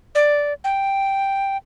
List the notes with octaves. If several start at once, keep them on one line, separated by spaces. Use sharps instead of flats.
D5
G5